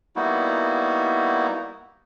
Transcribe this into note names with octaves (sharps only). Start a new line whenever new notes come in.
G3 A#3 B3 D#4 E4 F#4